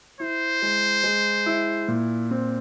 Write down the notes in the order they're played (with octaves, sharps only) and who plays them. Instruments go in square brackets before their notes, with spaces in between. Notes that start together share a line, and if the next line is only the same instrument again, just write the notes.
[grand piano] E4 [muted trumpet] C5
[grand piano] G#3
G#3
E4
A#2
C4